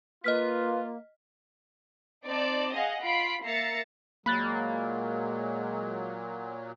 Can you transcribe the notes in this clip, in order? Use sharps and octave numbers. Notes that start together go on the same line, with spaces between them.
A#3 F4 B4 D#5 F6 B6
C4 D#4 D5 A5
G#4 D#5 F5 F#5
F4 B5 B6 C7 D7
A#3 E5 A#5 A6 C7 C#7
A#2 F#3 G#3 A#3 B5 F#6 A6